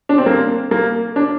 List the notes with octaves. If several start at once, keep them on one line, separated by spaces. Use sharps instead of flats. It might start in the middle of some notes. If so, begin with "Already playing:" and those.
D4
C4
A#3
A#3
D4